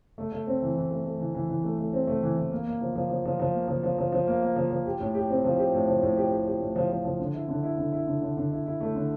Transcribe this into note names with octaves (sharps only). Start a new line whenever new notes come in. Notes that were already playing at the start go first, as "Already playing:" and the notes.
A3
A3
C4
E3
E3
A3
A3
E3
E3
E3
A3
A3
C4
A3
E3
E3
A#3
A#3
F3
F3
F3
F3
F3
A#3
F3
F3
F3
F3
A#3
A#3
F3
F3
G4
A2
G4
C4
F3
G4
A2
F3
A2
G4
G4
G4
A2
F3
F3
F3
D3
E4
D3
E4
D3
E4
D3
D3
D3
E4
E4
A3
D3